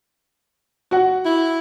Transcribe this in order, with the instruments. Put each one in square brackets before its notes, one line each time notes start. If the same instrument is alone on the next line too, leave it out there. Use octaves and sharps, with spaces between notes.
[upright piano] F#4 F#5
[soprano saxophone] E4